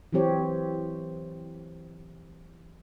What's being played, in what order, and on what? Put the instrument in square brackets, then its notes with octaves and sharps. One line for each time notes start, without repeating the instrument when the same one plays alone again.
[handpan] E3 F#3 C4 G4 C#5